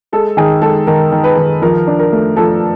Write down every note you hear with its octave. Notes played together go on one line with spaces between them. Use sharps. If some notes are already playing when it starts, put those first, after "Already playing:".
G#3 A4
D#3 G#4
G#3 A4
D#3 A#4
D#3
B4
D#3
F3 A#4
D4
A#4
A3
F3 A4